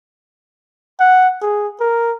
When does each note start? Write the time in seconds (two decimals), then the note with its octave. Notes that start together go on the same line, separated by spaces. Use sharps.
1.00 F#5
1.42 G#4
1.80 A#4